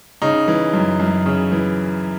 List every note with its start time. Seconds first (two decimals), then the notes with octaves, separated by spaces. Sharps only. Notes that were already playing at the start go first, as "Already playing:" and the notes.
0.22 C#3 D#4
0.48 E3
0.74 F#2
1.00 F#2
1.26 C#3
1.52 E3